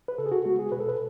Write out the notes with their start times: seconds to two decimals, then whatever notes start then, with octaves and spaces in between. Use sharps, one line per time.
0.08 B4
0.18 C#3 A4
0.26 G#4
0.32 F#4
0.45 G#3 B3 F#4
0.59 G#4
0.72 B2 B4
0.80 A4
0.88 B4